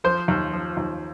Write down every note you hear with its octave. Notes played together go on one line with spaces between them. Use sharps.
F3 C5
D#2
F3
D#2